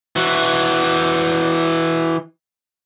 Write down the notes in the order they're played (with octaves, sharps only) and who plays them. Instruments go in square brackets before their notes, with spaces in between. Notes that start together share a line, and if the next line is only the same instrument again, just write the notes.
[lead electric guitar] E3 F#4